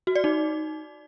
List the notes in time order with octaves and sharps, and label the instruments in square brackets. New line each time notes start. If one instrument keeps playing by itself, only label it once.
[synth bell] F#4
D5
D#4